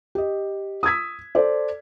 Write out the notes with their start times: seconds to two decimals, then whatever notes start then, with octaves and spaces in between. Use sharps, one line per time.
0.15 G4 D#5
0.83 D#6 E6 G#6 B6
1.35 A4 C5 D5